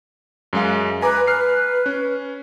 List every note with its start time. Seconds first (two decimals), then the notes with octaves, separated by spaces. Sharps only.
0.53 F#2 G#3 F5
1.02 B4 G#5 A#5 D6
1.27 B4 F6 C7
1.86 C#4